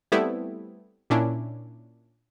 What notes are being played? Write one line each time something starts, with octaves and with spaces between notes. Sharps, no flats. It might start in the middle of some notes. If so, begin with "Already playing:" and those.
G3 A3 B3 C4 E4
A#2 C#4 D4 E4